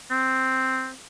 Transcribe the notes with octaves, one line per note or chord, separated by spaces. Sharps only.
C4